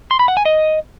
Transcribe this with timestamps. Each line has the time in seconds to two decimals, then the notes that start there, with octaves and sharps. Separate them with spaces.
0.11 C6
0.19 B5
0.28 F#5
0.37 G#5
0.45 D#5